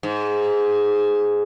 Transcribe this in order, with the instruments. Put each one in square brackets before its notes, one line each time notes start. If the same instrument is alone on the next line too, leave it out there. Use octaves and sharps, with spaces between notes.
[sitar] G#2